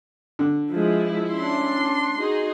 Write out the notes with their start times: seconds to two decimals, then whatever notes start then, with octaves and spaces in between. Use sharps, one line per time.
0.39 D3
0.71 F3 G#3 E4
1.33 C#4 D4 C6
2.16 D#4 F#4 G#4